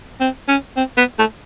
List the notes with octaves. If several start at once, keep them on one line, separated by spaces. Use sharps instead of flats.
C4
C#4
C4
B3
A3